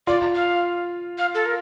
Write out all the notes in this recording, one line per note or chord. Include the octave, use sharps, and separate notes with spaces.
F4 D5
F5
F5
A4
A#4